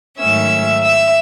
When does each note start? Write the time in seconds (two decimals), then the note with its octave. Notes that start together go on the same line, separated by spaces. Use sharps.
0.18 G#2 D#3 F#3 A3 C#4 E5 E6
0.82 E5 E6